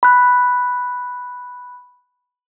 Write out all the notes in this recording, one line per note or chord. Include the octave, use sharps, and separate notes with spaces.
B5 F#6